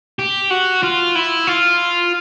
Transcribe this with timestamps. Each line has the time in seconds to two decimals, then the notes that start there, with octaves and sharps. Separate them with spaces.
0.19 G4
0.50 F#4
0.83 F4
1.15 E4
1.47 F4